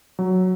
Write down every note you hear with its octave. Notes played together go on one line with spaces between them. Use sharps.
F#3